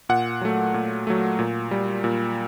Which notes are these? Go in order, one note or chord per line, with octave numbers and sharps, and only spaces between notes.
A#2 F#5
F#3 A3
A#2
F#3 A3
A#2
G3
A#2